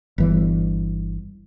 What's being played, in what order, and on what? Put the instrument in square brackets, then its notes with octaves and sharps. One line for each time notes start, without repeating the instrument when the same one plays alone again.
[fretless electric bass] G1 E3 G3